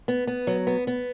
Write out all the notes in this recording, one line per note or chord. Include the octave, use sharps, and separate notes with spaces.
B3
B3
F#3
B3
B3